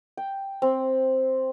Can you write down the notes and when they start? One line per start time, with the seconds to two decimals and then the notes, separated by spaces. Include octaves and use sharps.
0.17 G5
0.62 C4